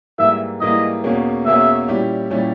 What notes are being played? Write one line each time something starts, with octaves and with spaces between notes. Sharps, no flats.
G#2 E3 G3 A#3 E4 E5
G#2 E3 G3 A#3 E4 D#5
E2 B2 A#3 C#4 G#4
E2 B2 A#3 C#4 G#4 E5
A#2 G3 C#4 E4 G4
A#2 G3 C#4 E4 G4